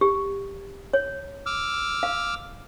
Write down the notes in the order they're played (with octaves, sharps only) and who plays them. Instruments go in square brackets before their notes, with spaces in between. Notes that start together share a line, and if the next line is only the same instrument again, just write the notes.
[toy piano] G4
C#5
[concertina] D6 E6 F6
[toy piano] F5